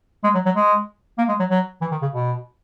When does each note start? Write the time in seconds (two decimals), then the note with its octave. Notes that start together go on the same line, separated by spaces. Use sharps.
0.24 G#3
0.35 F#3
0.45 F#3
0.55 G#3
1.18 A#3
1.28 G#3
1.39 F#3
1.50 F#3
1.81 E3
1.91 D#3
2.02 C#3
2.13 B2